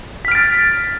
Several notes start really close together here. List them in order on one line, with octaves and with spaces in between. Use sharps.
B6 F6 D7 A6